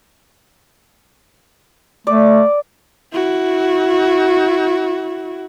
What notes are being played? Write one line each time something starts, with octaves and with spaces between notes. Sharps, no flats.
A3 D5
E4 F#4